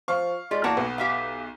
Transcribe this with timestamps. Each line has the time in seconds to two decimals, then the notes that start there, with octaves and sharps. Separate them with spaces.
0.08 F3 F5 C#6
0.51 G#3 F4 G4 D5
0.64 E2 A#3 F#4 F#5 A5
0.77 B1 B3
0.98 G4 E5 F5